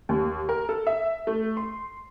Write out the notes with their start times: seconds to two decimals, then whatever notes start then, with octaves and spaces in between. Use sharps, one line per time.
0.09 D#2
0.49 A#4
0.69 A4
0.87 E5
1.27 A3
1.57 C6